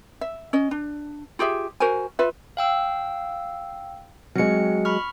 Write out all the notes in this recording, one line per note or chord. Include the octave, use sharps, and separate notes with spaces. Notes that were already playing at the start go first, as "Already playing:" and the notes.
E5
C#4 D#5
D4
F4 G4 G#4 E5
F#4 A#4 C5 G#5
F4 B4 E5
F5 G5 E6
F#3 G#3 C4 C#7
B5 C#6 F6